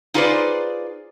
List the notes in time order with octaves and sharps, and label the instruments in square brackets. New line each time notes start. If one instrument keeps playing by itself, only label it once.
[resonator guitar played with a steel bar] D#4 F4 G#4 B4 C5 D5